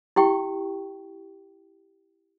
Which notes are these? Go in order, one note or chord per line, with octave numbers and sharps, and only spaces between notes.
E4 G4 G5 C#6